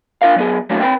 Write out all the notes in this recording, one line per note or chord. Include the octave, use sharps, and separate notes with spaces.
D4 F4 A#4 F5
F#3 B3 G#4
F#3 A3 A#3 C#4 D4 F#4
C4 B4 G5